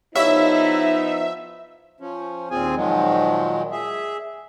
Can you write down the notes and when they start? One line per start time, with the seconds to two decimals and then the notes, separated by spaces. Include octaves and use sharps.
0.16 F3 B3 D#4 E4 G4 C#5 E5 F5
2.00 F3 C#4
2.51 D#2 A#2 C4 F4 G#4 G#5
2.76 A#2 D#3 F3 F#3 G#3
3.72 G#4 E5